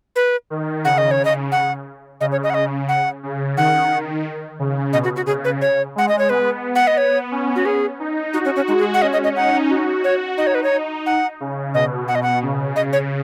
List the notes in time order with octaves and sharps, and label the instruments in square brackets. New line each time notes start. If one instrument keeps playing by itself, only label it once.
[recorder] B4
[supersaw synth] D#3
[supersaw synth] C#3 [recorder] F#5
[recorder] D#5
C#5
D#5
F#5
[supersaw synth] C#3 [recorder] D#5
[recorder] C#5
D#5
F#5
D#5
F#5
[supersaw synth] C#3
[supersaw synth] D#3 [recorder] F#5
[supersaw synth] C#3
[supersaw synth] B2 [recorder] D#5
[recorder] F#4
F#4
[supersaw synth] C#3 [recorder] G#4
[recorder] B4
C#5
[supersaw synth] G#3 [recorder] F#5
[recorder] D#5
C#5
[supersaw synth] B3 [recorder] B4
[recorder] F#5
D#5
[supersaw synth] B3 [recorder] C#5
[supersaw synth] C#4
[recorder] F#4
G#4
[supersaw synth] D#4
[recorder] D#4 [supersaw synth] F#4
[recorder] C#4
C#4
[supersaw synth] G#3 [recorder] D#4
[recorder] G#4
F#5
[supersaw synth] C#4 [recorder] D#5
[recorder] D#5
D#5
[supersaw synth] D#4 [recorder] F#5
[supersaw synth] F#4
[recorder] C#5
[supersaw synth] D#4 [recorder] D#5
[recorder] C#5
B4
C#5
F#5
[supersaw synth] C#3
[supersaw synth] B2 [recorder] D#5
[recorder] F#5
D#5
F#5
[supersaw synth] C#3
[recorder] D#5
C#5